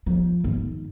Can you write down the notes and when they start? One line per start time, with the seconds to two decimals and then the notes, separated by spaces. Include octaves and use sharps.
0.06 F3
0.44 G#1